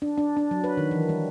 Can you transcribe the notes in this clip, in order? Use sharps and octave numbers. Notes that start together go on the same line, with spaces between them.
D4
D4
D4
F#3
B4
D#3
E3
G3